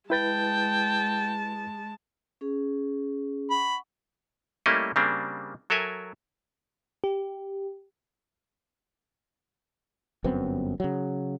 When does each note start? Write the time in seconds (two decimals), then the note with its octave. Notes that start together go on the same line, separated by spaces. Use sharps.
0.10 G#3 E4 B4 G5 A5 A6
2.41 C#4 G#4
3.50 F#5 B5 C#6
4.66 G3 A3 A#3 C#4 E4 D#5
4.96 C#3 G3 A#3 C4 D4
5.70 F#3 A4 A#4 E5 G#5
7.04 G4
10.24 G1 F#2 B3 C4
10.80 C#3 F#3